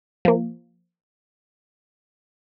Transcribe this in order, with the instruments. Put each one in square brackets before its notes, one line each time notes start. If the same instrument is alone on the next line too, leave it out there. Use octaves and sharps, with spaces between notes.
[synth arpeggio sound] F3 A#3